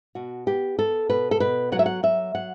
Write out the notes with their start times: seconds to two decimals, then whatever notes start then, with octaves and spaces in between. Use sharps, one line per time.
0.15 B2 F#4
0.47 B3 G4
0.79 B3 A4
1.09 B2 B4
1.31 A4
1.40 B2 B4
1.72 F#3 F#5
1.79 E5
1.86 F#5
2.03 F#3 E5
2.35 F#3 F#5